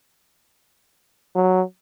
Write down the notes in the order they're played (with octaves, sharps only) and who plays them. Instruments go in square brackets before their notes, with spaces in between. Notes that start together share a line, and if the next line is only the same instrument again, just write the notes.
[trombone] F#3